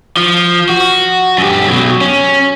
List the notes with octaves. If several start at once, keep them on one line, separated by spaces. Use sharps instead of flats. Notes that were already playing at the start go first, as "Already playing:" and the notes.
F3
F#4
F#2 G4
B2 F#3
C#4